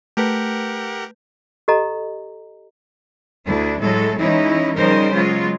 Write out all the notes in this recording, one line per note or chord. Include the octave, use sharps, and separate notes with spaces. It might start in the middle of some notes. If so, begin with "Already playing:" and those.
A3 G4 A#4 B4 F#5 G6
G4 A4 D#5 A#5
D2 D4 E4
A2 F#3 G#3 A4
E3 G#3 C#4 D#4 E4
C#3 F3 G3 D#4 A#4 C5
F#3 G#3 B3 F4